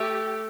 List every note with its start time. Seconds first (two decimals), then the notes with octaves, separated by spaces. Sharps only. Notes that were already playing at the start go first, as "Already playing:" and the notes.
Already playing: A3 G4